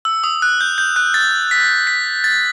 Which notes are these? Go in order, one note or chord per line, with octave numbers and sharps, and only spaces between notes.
E6
D#6
F#6
G6
G6
F#6
A6
B6
B6
A6